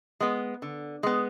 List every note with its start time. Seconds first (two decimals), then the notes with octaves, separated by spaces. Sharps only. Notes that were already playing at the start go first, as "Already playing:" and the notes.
0.20 G#3 B3
0.62 D3
1.03 G#3 B3